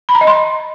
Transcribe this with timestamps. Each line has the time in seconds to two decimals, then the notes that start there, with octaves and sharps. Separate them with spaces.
0.09 B5
0.15 A#5
0.21 D#5
0.27 C6